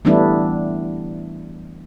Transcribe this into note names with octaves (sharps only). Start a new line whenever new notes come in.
E3 G3 A3 B3 D4 E4